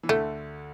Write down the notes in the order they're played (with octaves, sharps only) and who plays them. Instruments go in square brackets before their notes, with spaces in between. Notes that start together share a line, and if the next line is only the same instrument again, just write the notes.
[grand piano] E3
[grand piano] D2 D3 [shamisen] A3